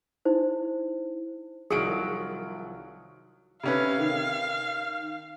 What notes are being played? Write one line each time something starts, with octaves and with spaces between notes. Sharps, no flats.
D#4 E4 C5
C2 D#3 F3 F#3 G#4 D7
C3 C#4 B4 F5
D#3